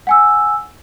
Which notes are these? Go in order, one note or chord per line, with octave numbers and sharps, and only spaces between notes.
F#5 G#5 E6